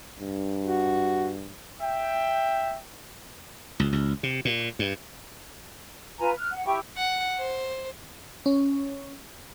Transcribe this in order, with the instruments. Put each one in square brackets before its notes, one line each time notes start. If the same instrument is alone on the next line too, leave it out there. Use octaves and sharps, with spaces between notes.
[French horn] G2
[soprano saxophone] F#4
[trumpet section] E5 G5
[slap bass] C#2
C#2
C3
A#2
G2
[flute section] F4 B4 G#5 A#5
F6 F#6
F#5
E4 G4 G5 C#6
[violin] F#5
C5
[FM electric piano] C#4